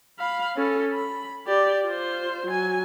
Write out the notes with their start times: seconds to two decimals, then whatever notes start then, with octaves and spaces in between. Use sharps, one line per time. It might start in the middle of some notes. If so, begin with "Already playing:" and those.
0.19 F5 B5
0.56 C#4 A4
0.92 B5
1.47 G4 D5
1.86 F4 C5
2.47 F#3 G#5